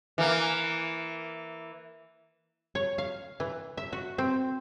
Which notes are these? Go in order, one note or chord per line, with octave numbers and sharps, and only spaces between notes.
E3 A#3
C#5
F5
E3
E5
F#4
C4